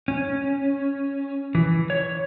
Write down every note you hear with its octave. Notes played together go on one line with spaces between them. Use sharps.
C#4
E3
C#5